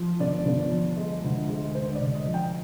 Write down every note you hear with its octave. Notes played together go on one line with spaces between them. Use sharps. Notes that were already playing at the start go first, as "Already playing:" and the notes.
Already playing: F3
G1 D5
G1
F3
G#3
D2
G#3
D2 C5
D5
D2
D#5
F3
G5